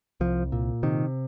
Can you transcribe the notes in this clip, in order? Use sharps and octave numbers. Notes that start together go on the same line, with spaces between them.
C2 F3
A#2
C3 D#3